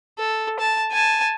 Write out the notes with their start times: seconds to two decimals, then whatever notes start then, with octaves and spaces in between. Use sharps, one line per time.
0.18 A4
0.59 A5
0.92 G#5 A5